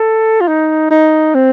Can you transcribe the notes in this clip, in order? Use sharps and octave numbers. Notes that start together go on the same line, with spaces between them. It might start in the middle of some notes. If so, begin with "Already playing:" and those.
Already playing: A4
F4
D#4
D#4
C4